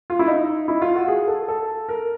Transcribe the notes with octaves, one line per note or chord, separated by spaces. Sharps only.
F4
E4
D#4
E4
F4
F#4
G#4
A4
A4
A#4